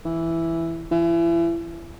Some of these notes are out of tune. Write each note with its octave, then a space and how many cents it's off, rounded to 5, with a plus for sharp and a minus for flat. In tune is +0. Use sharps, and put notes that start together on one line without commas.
E3 +5
E3 +35